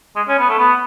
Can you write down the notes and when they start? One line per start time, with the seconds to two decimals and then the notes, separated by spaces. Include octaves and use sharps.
0.16 G#3
0.29 C#4
0.39 B3
0.49 A3
0.58 B3